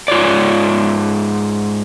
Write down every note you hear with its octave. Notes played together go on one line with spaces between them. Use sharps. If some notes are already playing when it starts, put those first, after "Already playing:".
G#2 F4 C#5 D5